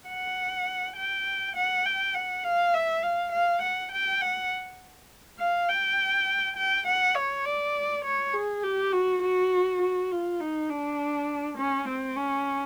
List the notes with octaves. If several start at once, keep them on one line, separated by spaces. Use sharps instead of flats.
F#5
G5
F#5
G5
F#5
F5
E5
F5
F5
F#5
G5
F#5
F5
G5
G5
F#5
C#5
D5
C#5
G#4
G4
F#4
F#4
F#4
F4
D#4
D4
C#4
C4
C#4